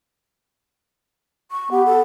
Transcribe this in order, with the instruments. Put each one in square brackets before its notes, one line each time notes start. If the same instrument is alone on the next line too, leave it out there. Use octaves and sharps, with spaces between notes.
[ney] C#6
[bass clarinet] B3 [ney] G4
[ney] A4